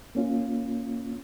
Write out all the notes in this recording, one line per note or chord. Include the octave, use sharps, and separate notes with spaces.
A#3 C#4 F4